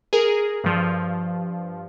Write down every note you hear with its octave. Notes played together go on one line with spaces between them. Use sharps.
G#4 A#4
G2 F3